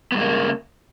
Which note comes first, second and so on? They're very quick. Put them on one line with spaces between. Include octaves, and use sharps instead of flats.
B3 G2 G#3 A#3 C#3